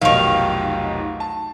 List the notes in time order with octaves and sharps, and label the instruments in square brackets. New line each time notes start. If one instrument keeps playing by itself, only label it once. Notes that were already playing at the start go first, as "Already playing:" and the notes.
[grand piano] F1 B1 D#4 [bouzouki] D#3 F5
[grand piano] A5